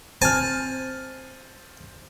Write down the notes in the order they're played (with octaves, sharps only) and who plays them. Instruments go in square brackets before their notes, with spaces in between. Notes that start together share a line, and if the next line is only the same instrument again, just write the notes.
[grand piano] C4 F6 [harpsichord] G#5 A5